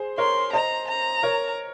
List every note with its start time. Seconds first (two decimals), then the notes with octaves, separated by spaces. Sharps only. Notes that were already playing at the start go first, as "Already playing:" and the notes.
Already playing: G#4 C5
0.18 A#4 C#5 C6
0.53 C5 D#5 A#5
0.88 A#5
1.23 A#4 C#5